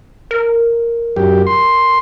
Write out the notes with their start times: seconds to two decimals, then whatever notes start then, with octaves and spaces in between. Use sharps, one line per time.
0.31 A#4
1.16 F#2 G4
1.47 C6